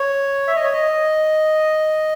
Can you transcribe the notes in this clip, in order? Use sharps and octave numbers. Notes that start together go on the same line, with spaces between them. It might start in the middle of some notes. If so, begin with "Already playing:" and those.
Already playing: C#5
E5
D#5
C#5
D#5